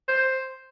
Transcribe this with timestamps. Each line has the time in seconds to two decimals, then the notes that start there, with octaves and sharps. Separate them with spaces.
0.08 C5